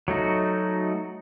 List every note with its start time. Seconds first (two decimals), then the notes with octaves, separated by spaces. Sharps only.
0.08 F#3 A3 D#4 F#4